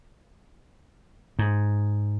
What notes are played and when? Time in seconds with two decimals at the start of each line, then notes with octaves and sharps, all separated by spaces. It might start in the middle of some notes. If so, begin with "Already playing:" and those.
1.39 G#2